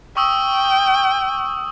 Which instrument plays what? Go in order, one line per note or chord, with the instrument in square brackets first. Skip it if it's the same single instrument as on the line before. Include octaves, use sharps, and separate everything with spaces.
[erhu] G5 [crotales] C#6 D#6 E6